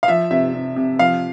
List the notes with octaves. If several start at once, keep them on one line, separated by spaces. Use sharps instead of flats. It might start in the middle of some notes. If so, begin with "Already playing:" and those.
F5
F3 E5
C3 E5
C3
C3
F3 F5